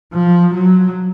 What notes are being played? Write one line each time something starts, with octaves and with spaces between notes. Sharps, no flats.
F3
F#3